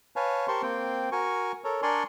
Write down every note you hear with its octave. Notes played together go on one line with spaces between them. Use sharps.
B4 C#5 F5 G#5 A5
G4 A#4 C5 A5 C6 C#6
A#3 C4 G5
F#4 A#4 G#5 C#6
A4 A#4 C#5
D4 A#4 D5 G#5 C6 C#6